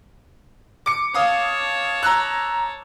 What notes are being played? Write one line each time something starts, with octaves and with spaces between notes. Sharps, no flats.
D6 C#7
C#5 F5 A5 D#6
A#5 E6 F#6